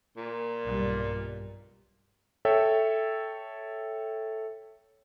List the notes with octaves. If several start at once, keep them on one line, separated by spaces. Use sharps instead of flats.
A#2
B1 G2 G3
A4 C#5 E5 G5